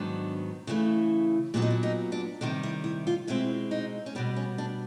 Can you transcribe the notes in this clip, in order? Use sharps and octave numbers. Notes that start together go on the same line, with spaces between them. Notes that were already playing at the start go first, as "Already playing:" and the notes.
Already playing: G#2 D#3 F#3 B3 D4
C#3 E3 A3
A#2 F#3 B3 D4
D#4
D4
D#4
D4
C3 D#3 G3 D4
E4
E4
F4
B2 G#3 C4 E4
D#4
C#4
B2 G3 B3 D4
C#4
D4